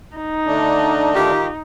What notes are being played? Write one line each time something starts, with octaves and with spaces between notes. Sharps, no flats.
D#4
D3 A3 D4
D#3 F4 G4